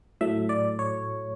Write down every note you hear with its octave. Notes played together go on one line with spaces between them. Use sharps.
A2 F#3 A3 E5
D5
C#5